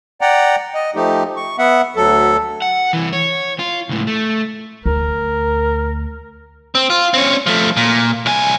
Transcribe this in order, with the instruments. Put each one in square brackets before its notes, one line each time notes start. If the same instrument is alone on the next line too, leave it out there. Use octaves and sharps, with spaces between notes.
[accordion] D5 F#5 G5 A#5
D#5
F3 A3 D#4 G4
C#6
B3 E5 F#5
D2 F#3 A4
[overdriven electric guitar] F#5
C2 E3
C#5
F4
C#2 A2
A3
[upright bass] D2 [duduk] A#4
[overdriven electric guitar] C4
F4
C4 C#4
F3 A3
A#2
C2 G#5